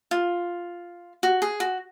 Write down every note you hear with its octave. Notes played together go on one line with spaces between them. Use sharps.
F4
F#4
G#4
F#4